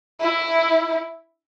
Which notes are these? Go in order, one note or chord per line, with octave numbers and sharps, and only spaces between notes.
E4